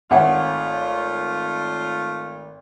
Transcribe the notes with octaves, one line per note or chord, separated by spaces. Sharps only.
G#1 A3 F4 C#5 E5 F#5 G#5